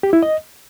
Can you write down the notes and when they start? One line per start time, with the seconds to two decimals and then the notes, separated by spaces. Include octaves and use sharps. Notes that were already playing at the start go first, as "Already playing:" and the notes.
0.03 G4
0.13 E4
0.23 D#5